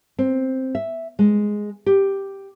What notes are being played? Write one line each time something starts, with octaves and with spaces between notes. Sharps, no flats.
C4
E5
G#3
G4